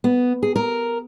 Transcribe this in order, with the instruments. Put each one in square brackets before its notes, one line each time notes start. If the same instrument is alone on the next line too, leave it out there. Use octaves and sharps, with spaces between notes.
[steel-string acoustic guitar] B3
G#4
A#4